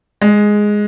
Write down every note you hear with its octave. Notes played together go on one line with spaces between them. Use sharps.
G#3